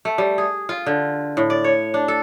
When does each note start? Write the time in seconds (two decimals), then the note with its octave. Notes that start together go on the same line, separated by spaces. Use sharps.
0.05 A3
0.18 G3
0.38 G#4
0.69 F4
0.86 D3
1.37 A2
1.50 D5
1.64 C#5
1.94 D4
2.08 A4